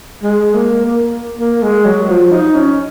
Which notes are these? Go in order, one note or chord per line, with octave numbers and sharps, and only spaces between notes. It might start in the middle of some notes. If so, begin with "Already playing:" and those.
G#3
A#3
A#3
A#3
G#3
F#3
F3
D#4
C#4